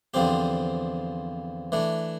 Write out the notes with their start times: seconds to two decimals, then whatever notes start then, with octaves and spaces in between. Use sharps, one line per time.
0.14 E2 D3 F3 C4 G4
1.72 E3 A3 D4